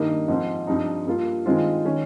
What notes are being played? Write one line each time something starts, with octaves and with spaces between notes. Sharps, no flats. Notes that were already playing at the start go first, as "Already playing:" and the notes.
Already playing: G2 D#3 A#3 D#4
G#2 F3 C4
G2 F3 C4 D#4
G2 G3 A#3 F4
G2 D#3 G#3 C4 F4
D#3 G#3 C#4